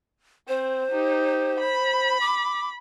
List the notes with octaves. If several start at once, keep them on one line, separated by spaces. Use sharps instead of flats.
C4 C5
D#4 G4
B5
D6